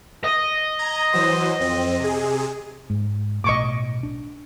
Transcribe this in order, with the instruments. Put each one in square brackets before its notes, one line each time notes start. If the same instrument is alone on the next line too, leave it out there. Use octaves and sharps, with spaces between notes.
[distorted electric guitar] D#5
[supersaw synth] A#5 G#6
E3 F#3 C5
F2 C4
C3 G#4
[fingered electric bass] G#2
[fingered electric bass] B1 A2 [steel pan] D#5 C#6 D6
[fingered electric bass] D4